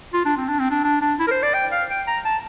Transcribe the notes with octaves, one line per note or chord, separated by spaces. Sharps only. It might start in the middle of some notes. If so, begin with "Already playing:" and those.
F4
D4
C4
D4
C4
D4
D4
D4
E4
A#4
C5
D5
G5
F5
G5
A#5
A5